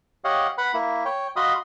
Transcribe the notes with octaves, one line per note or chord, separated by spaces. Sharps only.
G4 C#5 D#5 F5 F#5
B4 F#5 B5
A#3 E4
C#5 G5
F#4 D#5 F5 B5 C6 D#6